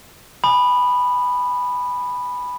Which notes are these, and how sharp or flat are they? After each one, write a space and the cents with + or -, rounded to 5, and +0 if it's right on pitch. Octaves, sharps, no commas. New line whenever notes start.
G#5 +0 B5 +0 D#6 -30